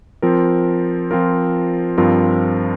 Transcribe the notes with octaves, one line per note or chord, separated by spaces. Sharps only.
F3 C4 F4 A#4
F3 C4 F4 A#4
G2 F3 C4 F4 A#4